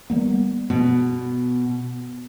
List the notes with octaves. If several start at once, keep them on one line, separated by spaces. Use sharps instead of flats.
G3 A#3 B3
B2 B3